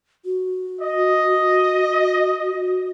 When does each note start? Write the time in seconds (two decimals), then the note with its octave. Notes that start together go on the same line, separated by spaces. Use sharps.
0.25 F#4
0.81 D#5